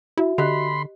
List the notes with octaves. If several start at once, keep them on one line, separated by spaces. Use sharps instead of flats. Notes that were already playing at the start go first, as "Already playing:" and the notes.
E4 F#4 E5
D3 G4 D#5 B5 C6 F#6